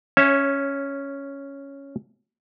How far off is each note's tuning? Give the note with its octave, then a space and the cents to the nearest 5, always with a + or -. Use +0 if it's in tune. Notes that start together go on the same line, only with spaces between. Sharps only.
C#4 +0 C#5 -20 E5 +0